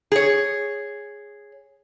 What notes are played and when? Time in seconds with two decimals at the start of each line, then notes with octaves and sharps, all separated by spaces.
0.12 G#4 C#5